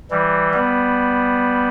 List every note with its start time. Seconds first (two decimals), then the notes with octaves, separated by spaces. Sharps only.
0.11 E3 G3
0.54 G3 B3